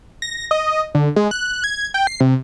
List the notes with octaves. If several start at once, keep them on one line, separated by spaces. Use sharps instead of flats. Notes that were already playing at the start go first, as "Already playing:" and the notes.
A#6
D#5
D3
G#3
F#6
G#6
G5
C7
C3